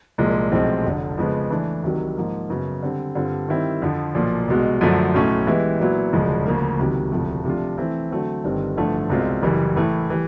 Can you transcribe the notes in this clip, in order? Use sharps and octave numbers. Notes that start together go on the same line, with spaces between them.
C2 A#2 F3 G#3
B1 A2 F3 G#3 C4
F1 F2 D3
F2 C#3 F3 G#3 B3
E3 A3 D4
C2 C3 D#3 F#3
G#2 F3 A#3
F#2 C#3 F#3 B3
D3 G3 C4
G2 D3 G3 C4 F4
D#3 G3 C4 E4
F2 D3 F3
B1 A#2 F3
C2 B2 G#3
F#2 D3 F3 A3 D4
B1 A2 F#3 A3 C#4
E3 G#3 B3 E4 G4
A#2 F#3 B3 E4
E1 D2 C#3 F3 G#3
D2 C#3 F3 A#3
C#2 C3 D#3 F#3
E1 D2 C3 F3 A3
C3 F3 A3 D4 F4
E3 A3 C4 E4
D3 F#3 A3 C4
G1 G2 D#3 G3 C4
A1 G2 D3 F3 A3
C2 B2 G#3 C4 F4
F#1 F#2 C#3 E3 G3
A2 E3 A3
E3 G3